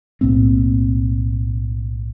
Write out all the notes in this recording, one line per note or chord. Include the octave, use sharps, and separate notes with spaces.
B1 A2 A#3 C4